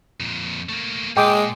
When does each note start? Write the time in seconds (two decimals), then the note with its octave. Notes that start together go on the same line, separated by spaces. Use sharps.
0.20 F2 A#2
0.69 A3 A#3
1.17 A#2 G#3 G5 D6